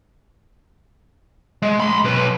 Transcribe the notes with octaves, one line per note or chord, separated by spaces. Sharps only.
G#3
B5 C6
B1 B4